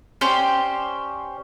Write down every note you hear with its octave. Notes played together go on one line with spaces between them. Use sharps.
C#4 G4 C5 D5